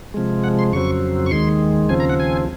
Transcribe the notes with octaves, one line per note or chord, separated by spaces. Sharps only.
C3 F3 G#3
F#5
C6
F2 C#3 F#3 C4 C#6
C#6
D#2 D#3 G#3 C6
D#2 C#3 F3 C4 G#5
A#5
F#5
G#5